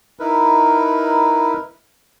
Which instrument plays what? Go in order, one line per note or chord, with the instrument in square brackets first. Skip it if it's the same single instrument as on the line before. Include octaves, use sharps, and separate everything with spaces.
[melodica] D#4 E4 A#4 B4